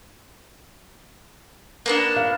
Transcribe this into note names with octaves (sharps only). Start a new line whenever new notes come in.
A#3 B3 D4
F5